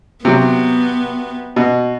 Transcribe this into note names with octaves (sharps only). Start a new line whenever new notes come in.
C3 F#3 B3
B2